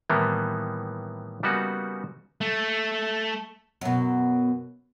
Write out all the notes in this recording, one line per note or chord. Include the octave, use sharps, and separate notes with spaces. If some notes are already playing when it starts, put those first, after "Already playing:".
A2 D#3 E3 G3 A#3 B3
C#3 G3 A#3 B3 D#4 F#4
A3
F#2 B2